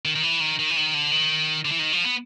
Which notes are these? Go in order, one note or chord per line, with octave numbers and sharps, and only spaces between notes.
D#3
D#3
E3
D#3
D#3
E3
D#3
D3
D#3
D3
E3
D#3
F3
B3